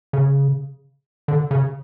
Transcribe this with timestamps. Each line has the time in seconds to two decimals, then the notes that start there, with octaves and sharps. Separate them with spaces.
0.13 C#3
1.28 D3
1.51 C#3